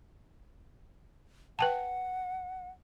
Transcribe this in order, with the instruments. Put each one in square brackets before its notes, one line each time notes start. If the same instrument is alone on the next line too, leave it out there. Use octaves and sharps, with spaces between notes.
[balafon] B4 G5 A5 [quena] F#5